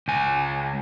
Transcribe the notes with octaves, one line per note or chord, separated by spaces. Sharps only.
C#2 G#5